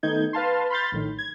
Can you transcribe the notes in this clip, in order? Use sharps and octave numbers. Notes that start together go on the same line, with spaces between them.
D#3 A3 B3 D#4 G6 G#6
B4 F5 A5 C6
B5 C6 F6 G6 A6
A#1 A2 D#3
G#6